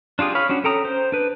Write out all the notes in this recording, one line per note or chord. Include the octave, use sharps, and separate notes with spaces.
D4 F4 G4 G#4
C#5 F5 B5
C#4 D4 F#4
C#4 A4 G5 A#5 D#6
C5
D4 B4